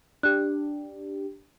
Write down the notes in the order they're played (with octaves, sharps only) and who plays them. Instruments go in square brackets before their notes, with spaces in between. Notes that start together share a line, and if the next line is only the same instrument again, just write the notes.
[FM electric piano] D4 G4 [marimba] F#6